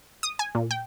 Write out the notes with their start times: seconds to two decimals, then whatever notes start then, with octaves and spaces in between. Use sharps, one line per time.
0.23 D#6
0.39 G#5
0.55 A#2
0.71 G5